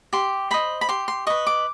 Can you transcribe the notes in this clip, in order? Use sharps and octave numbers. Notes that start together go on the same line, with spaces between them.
G4 C6
C5 D#5 B5
B5
G4 C6
C6
B4 D#5 C#6
D6